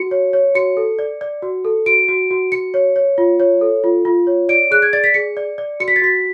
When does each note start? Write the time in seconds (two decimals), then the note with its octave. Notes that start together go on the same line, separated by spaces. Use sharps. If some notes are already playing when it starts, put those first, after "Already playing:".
Already playing: F#4 C#7
0.11 C#5
0.33 C#5
0.55 F#4 C#7
0.77 A4
0.99 D5
1.21 D5
1.43 F#4
1.65 A4
1.86 F#4 D7
2.08 F#4
2.31 F#4
2.52 F#4 C#7
2.74 C#5
2.96 C#5
3.18 F4
3.40 C#5
3.61 A4
3.84 F4
4.05 F4
4.27 C#5
4.49 D5 D7
4.71 G#4 F#6
4.82 G#6
4.93 D5 A6
5.04 B6
5.14 G#4 C#7
5.37 D5
5.58 D5
5.80 F#4 C#7
5.88 B6
5.96 A6
6.02 F#4 B6